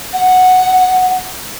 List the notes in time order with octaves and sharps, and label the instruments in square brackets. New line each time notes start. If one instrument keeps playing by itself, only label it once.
[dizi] F#5